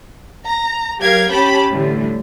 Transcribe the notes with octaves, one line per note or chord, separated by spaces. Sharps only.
A#5
F#3 G4 A#4 F5 G#6
C#4 G4 G5 A5 B5
A2 D3 E3 G3